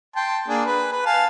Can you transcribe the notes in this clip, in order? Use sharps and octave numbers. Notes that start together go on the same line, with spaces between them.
G5 A5 C6
A#3 D4 G#4
B4
B4
F5 G#5 A5